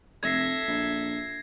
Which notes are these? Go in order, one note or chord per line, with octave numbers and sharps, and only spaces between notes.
F1 A4 E5 G#6 A#6 C7
A#1